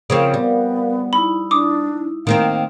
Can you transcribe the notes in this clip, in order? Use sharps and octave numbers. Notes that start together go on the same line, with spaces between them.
C#3 F3 C4 A#4 F5
G3 B3
D#4 E4 B5
D4 D6 D#6
D#3 A#3 C4 F5